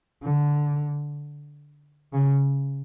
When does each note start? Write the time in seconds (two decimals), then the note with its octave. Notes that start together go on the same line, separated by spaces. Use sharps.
0.23 D3
2.13 C#3